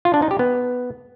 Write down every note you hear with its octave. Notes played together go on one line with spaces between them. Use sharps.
F4
D4
D#4
G4
B3